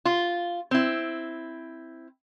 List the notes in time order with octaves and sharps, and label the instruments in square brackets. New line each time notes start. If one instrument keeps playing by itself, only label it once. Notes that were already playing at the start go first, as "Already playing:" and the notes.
[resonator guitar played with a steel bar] F4
C4 E4